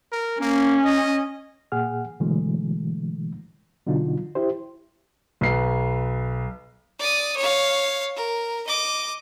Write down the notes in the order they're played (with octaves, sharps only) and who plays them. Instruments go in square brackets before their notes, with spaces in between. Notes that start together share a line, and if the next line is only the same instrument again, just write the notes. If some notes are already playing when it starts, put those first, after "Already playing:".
[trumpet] A#4
[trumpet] A#3 [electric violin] C#4
[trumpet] D#5
[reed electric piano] A#2 G#4 F#5 F6
B2 D3 E3 F#3 G#3 A3
B2 D3 F#3 D#4 F4
E4 G4 C5
[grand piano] B1 B4 C7
[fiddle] D5 D#6
C#5 F5
A#4
D#5 D6